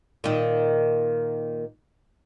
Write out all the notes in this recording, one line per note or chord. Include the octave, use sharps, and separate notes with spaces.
A#2 D#3